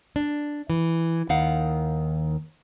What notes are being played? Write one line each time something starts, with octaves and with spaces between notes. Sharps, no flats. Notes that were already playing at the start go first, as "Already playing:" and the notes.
D4
E3
D#2 D#3 F5 F#5